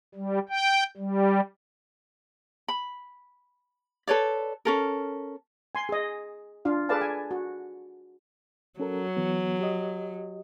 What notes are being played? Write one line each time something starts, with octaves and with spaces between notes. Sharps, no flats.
G3
G5
G3
B5
A4 B4 C#5 D5
C#4 A4 A#4
G#5 C6
G#4 D#5
D4 F4 F5
G#4 A4 B4 D5 F5 A5
G#5
F#4
F#3 C#4 A4 A#4
E3 B3
G4 D#5